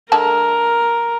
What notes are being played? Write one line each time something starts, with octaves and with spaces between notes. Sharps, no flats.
D3 G#3 A#4 A5